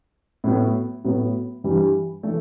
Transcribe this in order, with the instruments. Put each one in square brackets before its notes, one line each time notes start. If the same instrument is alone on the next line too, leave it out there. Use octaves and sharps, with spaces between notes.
[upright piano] A2 F#3 B3
A2 F#3 B3
G2 E3 G3
E3 A3